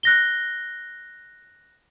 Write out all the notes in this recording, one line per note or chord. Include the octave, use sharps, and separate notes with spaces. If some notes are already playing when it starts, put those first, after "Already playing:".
F#6 A#6 G7